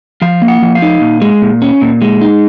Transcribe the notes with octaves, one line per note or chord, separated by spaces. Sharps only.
F3 F5
A#3
F#5
F3
F5
D#4
A#2
G#3
A#2
C#4
A#2
G#3
D#4